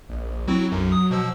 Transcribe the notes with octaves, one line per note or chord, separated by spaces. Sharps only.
A#1
F#3 C4 E4 F#4
B1 F#2
D#6
B2 F3 E6